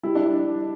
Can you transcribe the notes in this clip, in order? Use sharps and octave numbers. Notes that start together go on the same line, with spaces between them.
G3 E4
D4